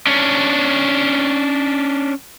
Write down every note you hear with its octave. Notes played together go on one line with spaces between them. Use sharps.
C#4 D4